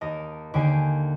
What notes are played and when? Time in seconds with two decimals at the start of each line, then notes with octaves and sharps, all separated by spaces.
0.01 D#2 A#4 D#5 A5
0.54 D#2 D3 G5 G#5 C7